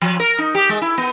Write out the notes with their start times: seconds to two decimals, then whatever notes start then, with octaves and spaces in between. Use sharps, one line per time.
0.02 F3
0.20 A#4
0.38 D#4
0.55 G4
0.69 G#3
0.82 E4
0.98 B3